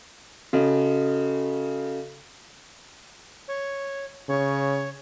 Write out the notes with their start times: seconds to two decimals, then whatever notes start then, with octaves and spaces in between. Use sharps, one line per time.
0.53 C#3 F#4 A4 D#5
3.48 C#5
4.29 C#3 C#5